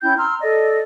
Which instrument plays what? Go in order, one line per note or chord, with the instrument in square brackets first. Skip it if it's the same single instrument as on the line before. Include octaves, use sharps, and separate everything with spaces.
[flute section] C#4 E4 G5 G6
A#5 C6 E6 F6
A4 D5 D#5